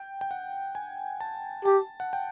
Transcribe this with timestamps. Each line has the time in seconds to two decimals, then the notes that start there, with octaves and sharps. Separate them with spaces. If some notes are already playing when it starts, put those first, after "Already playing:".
Already playing: G5
0.21 G5
0.31 F#5
0.75 G#5
1.20 A5
1.65 G4 A5
2.00 F#5
2.13 G5